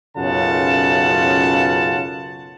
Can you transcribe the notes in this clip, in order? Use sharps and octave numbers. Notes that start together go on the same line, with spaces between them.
B1 F#2 C#3 F4 F#5 A5